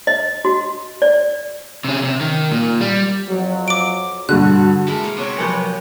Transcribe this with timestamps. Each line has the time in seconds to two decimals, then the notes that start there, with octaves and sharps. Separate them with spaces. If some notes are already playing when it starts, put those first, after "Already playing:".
0.07 D#5
0.45 F#4
1.02 D5
1.84 C3 C#4
2.04 C3
2.21 D#3
2.52 A#2
2.81 G3
3.29 F2 F3 F#3
3.68 D6 D7
4.29 G2 B2 D3 F#4 F#6
4.88 G#3 E4 A4 A#4
5.04 C#5 F5
5.18 C3 B3 C#5 D5
5.38 F3 F#3 F#4 G4 D#5 F#5